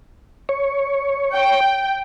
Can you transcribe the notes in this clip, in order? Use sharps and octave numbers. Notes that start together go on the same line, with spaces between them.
C#5
G5